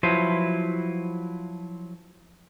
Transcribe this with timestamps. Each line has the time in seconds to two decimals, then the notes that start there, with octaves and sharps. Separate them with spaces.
0.03 F3 F#3 E4 B4 C5